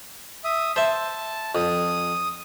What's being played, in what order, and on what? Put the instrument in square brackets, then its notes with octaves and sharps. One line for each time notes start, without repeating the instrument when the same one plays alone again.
[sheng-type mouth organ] E5 D#6
[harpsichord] C5 E5 [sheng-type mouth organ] A5
[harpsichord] F2 [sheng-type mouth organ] D#6